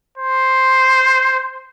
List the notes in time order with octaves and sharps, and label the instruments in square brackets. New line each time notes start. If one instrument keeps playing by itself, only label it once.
[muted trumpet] C5